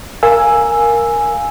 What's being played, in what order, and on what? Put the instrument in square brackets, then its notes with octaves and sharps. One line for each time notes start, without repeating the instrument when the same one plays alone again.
[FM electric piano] A#4 F5 G#5 E6